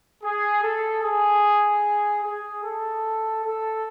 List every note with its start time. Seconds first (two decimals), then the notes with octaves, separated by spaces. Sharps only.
0.24 G#4
0.63 A4
1.03 G#4
2.24 G#4
2.64 A4
3.44 A4